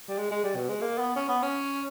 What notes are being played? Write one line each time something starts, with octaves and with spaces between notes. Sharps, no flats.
G3
G#3
G#3
G3
B2
G#3
A#3
B3
C#4
B3
C#4